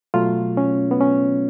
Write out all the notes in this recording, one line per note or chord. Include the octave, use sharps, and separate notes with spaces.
B2 F#3 A3 F4
C#4
B3
C#4